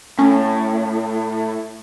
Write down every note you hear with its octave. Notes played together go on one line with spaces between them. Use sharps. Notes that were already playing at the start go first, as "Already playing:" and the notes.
A2 C#4